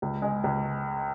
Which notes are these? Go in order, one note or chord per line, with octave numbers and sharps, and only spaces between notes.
C#2
G#3
C#2